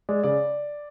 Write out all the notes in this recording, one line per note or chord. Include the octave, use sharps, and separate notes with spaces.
G#3 D5
C#3 D5